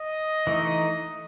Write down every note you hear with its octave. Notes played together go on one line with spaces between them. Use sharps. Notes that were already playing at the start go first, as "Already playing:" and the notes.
Already playing: D#5
E3 A3 D#4